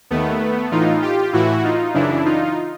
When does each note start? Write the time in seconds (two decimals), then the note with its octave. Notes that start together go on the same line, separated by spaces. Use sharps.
0.10 D#2 D#3 A3 B3
0.71 A2 E3 D#4 F4
1.02 F4 G4
1.33 A2 E3 E4 F#4
1.63 D#4 F4
1.94 F#2 C#3 E3 D4 E4
2.25 D#4 F4